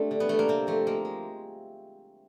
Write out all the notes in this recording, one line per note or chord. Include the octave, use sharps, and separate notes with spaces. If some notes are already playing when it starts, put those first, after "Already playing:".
Already playing: G3 A3 C4 D4
D3
B3
G3 A3
A#3
C3 C4
F3 A3
G#3 A#3
G#3